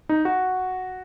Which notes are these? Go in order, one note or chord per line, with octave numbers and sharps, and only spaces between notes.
D#4
F#4